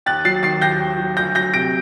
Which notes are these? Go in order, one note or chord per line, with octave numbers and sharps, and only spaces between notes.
D#2 F#6 A6
F#3 A6 C7
D#3 A6 C7
D#2 G6 A#6
D#2
F#3
D2 G6 A#6
F#3 G6 A#6
C3 A#6 D7